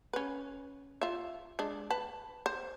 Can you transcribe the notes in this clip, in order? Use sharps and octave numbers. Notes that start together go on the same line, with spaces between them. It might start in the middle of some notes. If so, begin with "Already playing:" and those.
C#4 B4
F4 E5
G#3 D4
B4 A5
C5